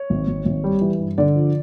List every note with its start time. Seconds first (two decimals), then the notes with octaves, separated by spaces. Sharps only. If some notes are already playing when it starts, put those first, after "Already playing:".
Already playing: C#5
0.10 G#1
0.27 G#1
0.45 G#1
0.64 G3
0.81 E3
0.99 G2
1.18 D3 D5
1.35 F3